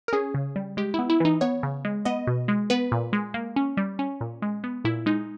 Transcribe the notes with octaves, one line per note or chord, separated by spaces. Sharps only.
A#4
C#4 G#4
C#3
G3
G#3 G4
B3 E4
E4
E3 D#4
B3 C#5
C#3
G#3
B3 D#5
B2
G#3
B3 B4
A#2
G#3
A#3
C#4
G3
C#4
A#2
G#3
B3
A#2 E4
G#3 D#4